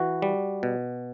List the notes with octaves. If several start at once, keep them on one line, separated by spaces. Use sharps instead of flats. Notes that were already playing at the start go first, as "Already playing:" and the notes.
Already playing: E3 F#4
G3
B2